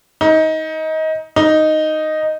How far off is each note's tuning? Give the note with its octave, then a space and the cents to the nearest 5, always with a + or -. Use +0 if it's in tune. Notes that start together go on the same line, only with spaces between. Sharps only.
D#4 +25
D#4 +0